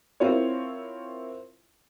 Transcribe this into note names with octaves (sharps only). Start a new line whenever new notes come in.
C4 E4 F4 A#4 C#5